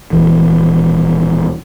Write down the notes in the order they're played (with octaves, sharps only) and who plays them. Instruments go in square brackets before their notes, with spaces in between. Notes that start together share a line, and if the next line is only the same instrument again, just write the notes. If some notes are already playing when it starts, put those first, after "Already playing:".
[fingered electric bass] D#1 E3